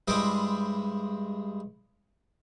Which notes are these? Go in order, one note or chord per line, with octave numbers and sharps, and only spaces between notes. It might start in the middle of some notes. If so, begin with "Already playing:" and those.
G2 G#3 E4 C5 D#5 D6